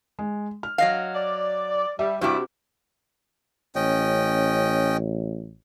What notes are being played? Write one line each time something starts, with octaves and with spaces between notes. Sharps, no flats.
G#3
F6
F#3 D#5 F5
D5
G3 E5
G2 C3 G3 E4 F#4 D6
A1 C#4 D#5 G5